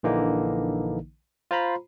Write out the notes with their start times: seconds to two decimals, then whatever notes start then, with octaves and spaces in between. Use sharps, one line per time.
0.03 A#1 D3 E3 A#3 D#4
1.51 F4 C5 A#5 B5